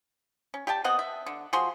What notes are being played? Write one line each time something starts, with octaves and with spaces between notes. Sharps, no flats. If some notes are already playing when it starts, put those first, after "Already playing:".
C#4
G4 D5 G5 A5
B3 C4 D#5 F#5
E5
D3
F3 F#4 G#4 C6